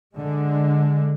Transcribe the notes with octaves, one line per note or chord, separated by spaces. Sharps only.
D3 G#3